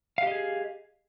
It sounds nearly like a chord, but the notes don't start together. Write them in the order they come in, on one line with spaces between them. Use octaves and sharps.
F5 G4 D#5 G#4